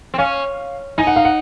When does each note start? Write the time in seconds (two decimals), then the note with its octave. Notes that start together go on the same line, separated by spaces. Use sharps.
0.14 C4
0.18 C#4 F5
0.98 D#4 G#5
1.07 F#5
1.16 F5
1.25 F#5